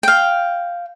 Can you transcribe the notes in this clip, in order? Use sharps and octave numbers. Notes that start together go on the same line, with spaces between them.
F5 G5